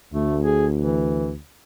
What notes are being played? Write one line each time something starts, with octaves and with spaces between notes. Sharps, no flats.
D2 A3
G#4
E3